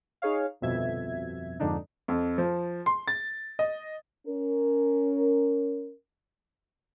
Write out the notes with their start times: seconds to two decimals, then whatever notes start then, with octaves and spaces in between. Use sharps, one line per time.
0.22 D#4 G#4 C#5 F5
0.61 G1 C2 F2 B2 E5 G#6
1.59 F2 G#2 D3 D4 D#4
2.08 F2
2.38 F3
2.86 C6
3.08 A6
3.59 D#5
4.27 C#4 A#4